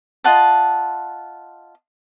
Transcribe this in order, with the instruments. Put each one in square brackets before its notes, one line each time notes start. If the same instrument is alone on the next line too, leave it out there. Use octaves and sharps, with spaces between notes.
[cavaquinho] F4 D#5 F#5 A5